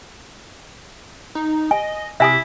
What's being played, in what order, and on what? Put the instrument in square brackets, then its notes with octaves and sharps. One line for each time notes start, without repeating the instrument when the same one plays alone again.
[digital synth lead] D#4
[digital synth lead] D#5 [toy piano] G#5
[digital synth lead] C3 [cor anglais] E4 [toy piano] E5 G#5 D#6